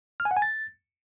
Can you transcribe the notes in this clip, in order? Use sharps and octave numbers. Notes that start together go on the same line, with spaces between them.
F6
G#5
F#5
G#5
A6